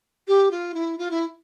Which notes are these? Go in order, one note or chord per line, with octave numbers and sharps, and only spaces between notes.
G4
F4
E4
F4
E4